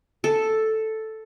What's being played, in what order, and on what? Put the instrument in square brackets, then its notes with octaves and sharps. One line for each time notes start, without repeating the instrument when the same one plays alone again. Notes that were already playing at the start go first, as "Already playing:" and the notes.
[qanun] A4